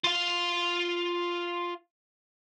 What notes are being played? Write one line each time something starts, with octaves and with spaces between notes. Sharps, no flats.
F4 F5